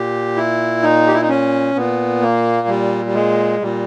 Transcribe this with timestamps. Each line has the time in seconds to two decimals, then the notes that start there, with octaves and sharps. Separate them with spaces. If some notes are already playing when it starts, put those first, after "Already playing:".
Already playing: A#2 G4
0.36 E4
0.83 D#4
1.07 G4
1.14 E4
1.22 D#4
1.29 C#4
1.75 A#2 B3
2.21 A#3
2.68 G3
3.06 G3
3.15 G#3
3.61 A#2 G3